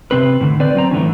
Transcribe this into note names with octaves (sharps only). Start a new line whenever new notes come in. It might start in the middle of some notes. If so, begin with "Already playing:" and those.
C3 C4 B4
A2 D3
C4 B4 D5
F#3 C4 A#5
A2 D3 E3 C#4